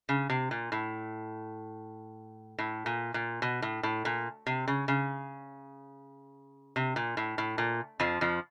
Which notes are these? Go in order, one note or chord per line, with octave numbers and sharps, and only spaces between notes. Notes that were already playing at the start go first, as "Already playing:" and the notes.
C#3
C3
A#2
A2
A2
A#2
A#2
B2
A2
A2
A#2
C3
C#3
C#3
C3
A#2
A2
A2
A#2
F2 F3
F2 F3